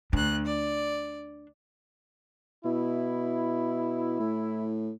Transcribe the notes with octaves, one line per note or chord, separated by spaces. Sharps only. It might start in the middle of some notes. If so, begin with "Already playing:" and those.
D2 D4 F#6
D5
B2 E4
A2